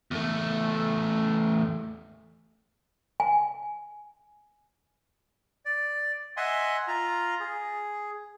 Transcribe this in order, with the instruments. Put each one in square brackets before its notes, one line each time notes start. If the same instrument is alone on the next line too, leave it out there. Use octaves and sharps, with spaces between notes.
[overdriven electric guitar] E2 A3
[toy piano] G#5
[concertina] D5
D#5 E5 F#5 G#5 C6
F4 A#5
G#4